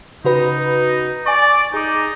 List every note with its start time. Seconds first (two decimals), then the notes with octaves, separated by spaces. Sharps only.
0.25 C#3 D#4 F#4 B4
1.26 D5 G#5 C#6
1.74 D#4 G#4 D6